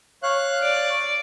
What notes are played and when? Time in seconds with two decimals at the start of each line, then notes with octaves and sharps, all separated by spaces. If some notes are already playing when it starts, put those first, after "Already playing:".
0.23 C#5 F5 F#6
0.63 D5